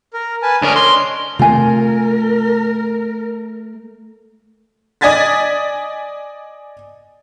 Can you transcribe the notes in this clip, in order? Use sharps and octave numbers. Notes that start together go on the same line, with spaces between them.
A#4
B4 G#5 A5
D2 C#4 D4 A#4 D#5
C6
C3 A3 F4 A#4 G#5
D5 D#5 G#5 G#6 A6 B6